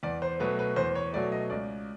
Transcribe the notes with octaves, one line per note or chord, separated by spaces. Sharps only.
E2 D5
C5
B2 F#3 A3 B4
B4
E2 C5
C#5
B2 F#3 A3 D5
D#5
C#2 D5